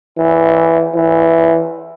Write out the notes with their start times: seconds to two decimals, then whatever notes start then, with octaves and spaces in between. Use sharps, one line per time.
0.18 E3
0.95 E3